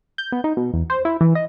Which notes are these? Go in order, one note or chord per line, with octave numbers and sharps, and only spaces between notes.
G6
B3
D#4
B2
E2
C5
E4
E3
D#5